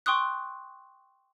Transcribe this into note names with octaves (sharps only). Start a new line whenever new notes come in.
G5 C6 C#6 D#6 F#6